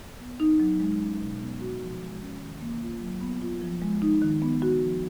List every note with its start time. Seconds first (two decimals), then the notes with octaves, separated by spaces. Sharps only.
0.20 B3
0.40 D#4
0.60 F#3
0.80 G#3
1.00 C#4
1.21 B2
1.40 B3
1.61 F#4
1.81 F3
2.00 G#3
2.21 C#4
2.41 D#3
2.61 A#3
2.82 F4
3.01 F#3
3.21 B3
3.42 F4
3.62 F3
3.82 G#3
4.02 D#4
4.22 D#3
4.42 B3
4.62 F#4
4.83 F3